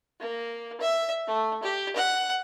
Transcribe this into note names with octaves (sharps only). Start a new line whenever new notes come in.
A#3
E5
A3
G4
F#5